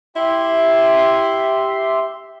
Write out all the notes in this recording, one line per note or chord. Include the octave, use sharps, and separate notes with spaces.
E4 G4 E5 C6